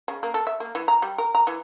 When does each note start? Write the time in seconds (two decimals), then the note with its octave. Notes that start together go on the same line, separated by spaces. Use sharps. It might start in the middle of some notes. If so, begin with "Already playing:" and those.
0.08 C#3
0.23 A#3
0.34 A4
0.47 E5
0.60 A#3
0.75 E3
0.88 A#5
1.02 G3
1.18 A#4
1.35 A#5
1.47 E3